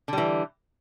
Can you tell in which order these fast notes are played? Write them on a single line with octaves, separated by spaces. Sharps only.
D3 G3 E3